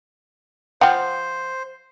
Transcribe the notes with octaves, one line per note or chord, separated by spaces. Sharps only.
F3 C5 F#5 G5